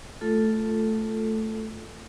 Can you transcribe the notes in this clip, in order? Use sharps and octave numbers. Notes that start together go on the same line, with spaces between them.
A3 F4 A4